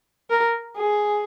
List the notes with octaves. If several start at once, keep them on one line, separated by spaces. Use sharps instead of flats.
A#4
G#4